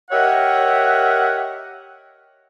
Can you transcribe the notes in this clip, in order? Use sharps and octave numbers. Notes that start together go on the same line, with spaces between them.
G4 A#4 C#5 D#5 E5 F#5